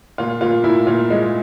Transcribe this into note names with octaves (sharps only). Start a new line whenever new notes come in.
A#2 F4
A#2 F4
A#2 E4
A#2 F4
G#3